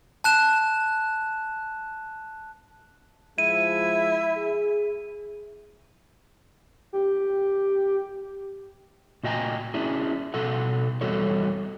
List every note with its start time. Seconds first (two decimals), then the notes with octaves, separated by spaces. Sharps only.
0.24 A5 F#6 E7
3.38 F3 G#3 E4 D#7
4.37 G#4
6.93 G4
9.23 A#2 F#4 D#5 G5 G#5 A#5
9.74 C#4 D4 E4 G#4
10.34 B2 F#4 A4 F#5
11.01 E2 G3 F#4 A4 C#5